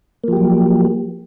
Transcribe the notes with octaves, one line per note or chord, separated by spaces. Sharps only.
F3 F#3 A#3 G4